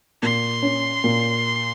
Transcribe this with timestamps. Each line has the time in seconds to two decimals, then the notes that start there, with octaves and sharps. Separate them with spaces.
0.22 A#2 C6
0.62 C#4
1.04 A#2